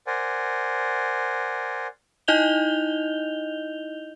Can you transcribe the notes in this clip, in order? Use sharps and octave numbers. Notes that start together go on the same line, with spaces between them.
A#4 C5 D5 F#5 G#5
D#4 E4 D#5 G6 F7 G7